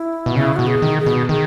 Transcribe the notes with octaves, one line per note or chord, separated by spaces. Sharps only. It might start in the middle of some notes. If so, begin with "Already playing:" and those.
Already playing: E4
B2
C#3 E4
B2 F#4
G#4
D#3
G#4
B2
D#3 G#4